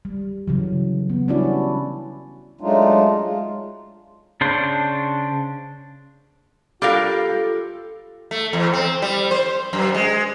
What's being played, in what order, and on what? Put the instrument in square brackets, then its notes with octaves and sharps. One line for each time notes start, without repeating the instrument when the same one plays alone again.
[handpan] G3
C#3 E3 F#3
B3
G3 C#4 D4 E4 F#4 D5
[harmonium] F#3 G#3 A3 D4 D#4 F4
G#3 F4
[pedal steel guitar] C#3 D4 C5
[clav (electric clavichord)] G3 D4 A#4 [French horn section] F4 [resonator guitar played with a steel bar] G4 F5 [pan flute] A4
[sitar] A3
E2
C4
G3
C5
F#2
G#3